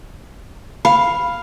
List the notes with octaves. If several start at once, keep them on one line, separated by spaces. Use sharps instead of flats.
F5 B5